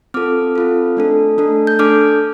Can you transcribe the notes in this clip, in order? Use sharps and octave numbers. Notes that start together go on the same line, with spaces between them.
C4 F4 A4 D6 F6
C4 F4 A4
A3 D4 A4
A3 D4 A4
G6
D4 A4 D6 F6